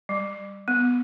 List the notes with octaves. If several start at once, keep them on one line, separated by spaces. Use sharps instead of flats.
G3
B3